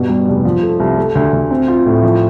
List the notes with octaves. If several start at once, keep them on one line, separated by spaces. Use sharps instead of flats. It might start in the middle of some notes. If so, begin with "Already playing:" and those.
Already playing: G2 B2
G3
F1
F3
A3
C2
A3
D2
D2
C4
F4
A2
F3